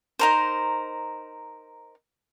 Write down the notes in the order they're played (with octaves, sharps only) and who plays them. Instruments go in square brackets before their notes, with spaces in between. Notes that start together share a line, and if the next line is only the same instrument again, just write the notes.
[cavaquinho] D#4 A#4 C5